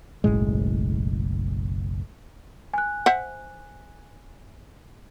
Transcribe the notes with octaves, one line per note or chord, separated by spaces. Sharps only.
F#1 B1 A2 G#3
G#5 F#6
C5 E5 F#5